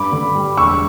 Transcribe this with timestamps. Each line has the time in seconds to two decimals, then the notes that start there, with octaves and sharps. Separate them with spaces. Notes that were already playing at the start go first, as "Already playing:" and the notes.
Already playing: G2 B5 D6
0.12 D3
0.34 G3
0.57 E1 C#6 E6